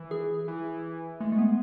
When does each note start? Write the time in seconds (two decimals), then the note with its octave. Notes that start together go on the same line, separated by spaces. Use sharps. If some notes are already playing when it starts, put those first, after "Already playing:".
Already playing: E3
0.11 G#4
0.48 E3
1.20 G#3 A3
1.32 A3
1.38 B3